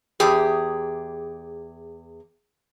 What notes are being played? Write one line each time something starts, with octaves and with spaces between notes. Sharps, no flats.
E2 G4 G#4